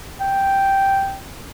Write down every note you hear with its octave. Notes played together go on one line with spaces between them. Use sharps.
G5